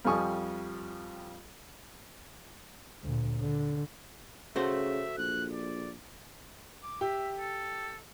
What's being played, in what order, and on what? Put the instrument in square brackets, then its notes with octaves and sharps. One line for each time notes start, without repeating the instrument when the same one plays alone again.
[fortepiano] F2 F3 G3 G#5 C#6 D#6
[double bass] D2 A#2
D3
[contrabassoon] C#3 [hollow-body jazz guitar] A3 F#4 C5 [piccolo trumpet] E5
[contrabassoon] A#1 [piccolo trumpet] F#6
[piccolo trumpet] D5
[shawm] D6
[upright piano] G4 [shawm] E5
[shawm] A4